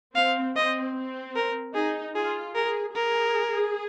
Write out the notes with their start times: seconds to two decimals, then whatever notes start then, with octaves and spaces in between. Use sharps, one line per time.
0.15 C4 F5
0.55 C4 D#5
0.95 C4
1.36 A#4
1.75 D#4 G#4
2.15 F4 G#4
2.55 G#4 A#4
2.95 G#4 A#4